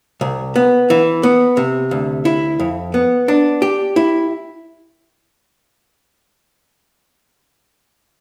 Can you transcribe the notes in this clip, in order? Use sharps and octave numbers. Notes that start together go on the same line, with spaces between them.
C2
B3
E3
B3
C3
D2
E4
F2
B3
D4
G4
E4